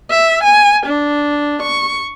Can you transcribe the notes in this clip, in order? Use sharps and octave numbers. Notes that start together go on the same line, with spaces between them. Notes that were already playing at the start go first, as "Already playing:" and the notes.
E5
G#5
D4
C#6